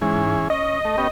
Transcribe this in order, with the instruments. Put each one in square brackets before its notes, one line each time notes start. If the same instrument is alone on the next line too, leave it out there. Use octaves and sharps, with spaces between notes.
[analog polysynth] G#2 [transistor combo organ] E3 C#4 G#4
[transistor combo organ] C#4 [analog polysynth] D#5
[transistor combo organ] A3
B3 C#4 G4